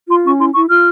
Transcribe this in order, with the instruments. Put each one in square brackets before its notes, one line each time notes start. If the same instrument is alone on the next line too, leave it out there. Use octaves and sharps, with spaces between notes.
[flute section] F4 C6
C#4 C#6
E4 C6
E4 C#6
F4 F6